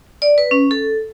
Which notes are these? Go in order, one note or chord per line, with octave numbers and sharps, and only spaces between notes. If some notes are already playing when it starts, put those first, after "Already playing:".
D5
B4
C#4
A4